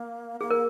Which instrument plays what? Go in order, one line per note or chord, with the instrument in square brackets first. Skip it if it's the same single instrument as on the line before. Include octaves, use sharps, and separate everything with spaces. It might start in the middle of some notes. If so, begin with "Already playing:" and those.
Already playing: [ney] A#3
[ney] A#3 [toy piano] G#4
[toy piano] A#4